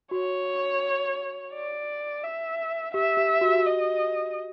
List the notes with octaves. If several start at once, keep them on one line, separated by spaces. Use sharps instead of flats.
F#4 C#5
D5
E5
G4 E5
G4
F#4
G4
F#4
D#5